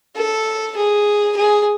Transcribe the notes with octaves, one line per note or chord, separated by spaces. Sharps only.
A4
G#4
G#4